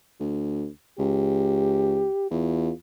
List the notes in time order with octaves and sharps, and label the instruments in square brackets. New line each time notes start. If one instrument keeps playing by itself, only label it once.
[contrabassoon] D2
[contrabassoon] C#2 [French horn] G4
[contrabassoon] E2 [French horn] F4